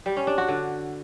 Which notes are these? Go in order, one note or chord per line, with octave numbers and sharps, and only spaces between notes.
G3
C#4
D4
F#4
D3